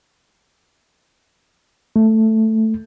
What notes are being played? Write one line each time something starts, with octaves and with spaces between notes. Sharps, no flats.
A3